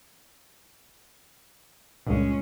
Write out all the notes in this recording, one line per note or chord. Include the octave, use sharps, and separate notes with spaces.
C#2 G2 A#2 G#3 C#4